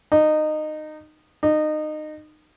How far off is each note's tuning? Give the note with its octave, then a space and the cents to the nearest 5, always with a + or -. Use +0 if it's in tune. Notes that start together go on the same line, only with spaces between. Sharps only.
D#4 -20
D#4 -25